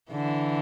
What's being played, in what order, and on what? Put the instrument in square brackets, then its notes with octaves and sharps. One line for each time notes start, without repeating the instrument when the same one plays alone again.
[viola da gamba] D3 E3